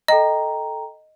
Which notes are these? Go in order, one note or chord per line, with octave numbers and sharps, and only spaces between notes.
A4 D#5 G5 A#5